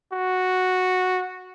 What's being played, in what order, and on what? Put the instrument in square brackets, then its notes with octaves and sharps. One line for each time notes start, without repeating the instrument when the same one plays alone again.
[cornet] F#4